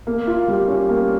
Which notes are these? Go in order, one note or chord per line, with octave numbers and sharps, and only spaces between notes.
A#3
F4
G3
C#4
A#3